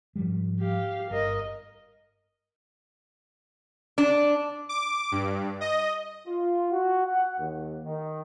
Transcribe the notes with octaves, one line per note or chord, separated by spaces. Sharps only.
G#2 F3 G3
G4 F5
G1 A#4 D#5
D4
D6
G2
D#5
F4
F#4
F#5
D#2
D#3